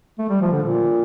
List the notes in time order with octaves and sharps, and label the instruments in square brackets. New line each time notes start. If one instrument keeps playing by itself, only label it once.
[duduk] A3
G3
F3
D3
A#2